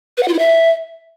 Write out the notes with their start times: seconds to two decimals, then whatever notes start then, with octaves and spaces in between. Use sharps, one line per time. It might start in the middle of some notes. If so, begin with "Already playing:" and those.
0.17 B4
0.23 F#5
0.28 F4
0.33 E4
0.39 E5